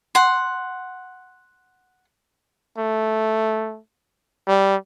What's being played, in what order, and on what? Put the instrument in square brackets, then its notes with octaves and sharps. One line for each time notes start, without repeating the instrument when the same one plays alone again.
[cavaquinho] F#5 C6
[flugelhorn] A3
G3